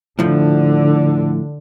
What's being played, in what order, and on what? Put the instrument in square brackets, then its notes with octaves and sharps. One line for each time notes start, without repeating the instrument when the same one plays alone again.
[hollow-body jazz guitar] A2 F3 [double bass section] D3